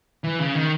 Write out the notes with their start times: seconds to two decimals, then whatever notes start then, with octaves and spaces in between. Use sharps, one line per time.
0.24 E3
0.39 C#3
0.55 D#3